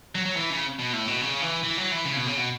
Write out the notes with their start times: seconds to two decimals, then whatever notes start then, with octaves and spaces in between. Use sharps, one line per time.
0.15 F#3
0.25 F#3
0.36 E3
0.50 C#3
0.79 B2
0.93 A2
1.07 B2
1.21 C#3
1.42 E3
1.64 E3
1.78 F#3
1.92 E3
2.05 C#3
2.17 B2
2.27 C#3
2.37 B2